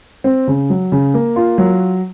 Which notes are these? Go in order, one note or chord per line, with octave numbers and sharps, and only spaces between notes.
C4
C#3
F#3
C#3
A#3
F4
F#3